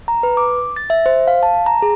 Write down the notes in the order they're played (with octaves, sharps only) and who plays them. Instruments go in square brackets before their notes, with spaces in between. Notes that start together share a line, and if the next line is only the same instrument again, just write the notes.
[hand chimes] A#5
B4
D6
A6
E5
C5
F5
A5
A#5
G#4